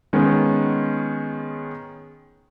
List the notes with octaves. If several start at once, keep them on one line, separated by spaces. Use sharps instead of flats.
D#3 G#3 B3 C#4